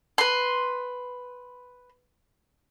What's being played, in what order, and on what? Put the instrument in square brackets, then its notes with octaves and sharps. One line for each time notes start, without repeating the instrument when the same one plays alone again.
[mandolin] B4 C6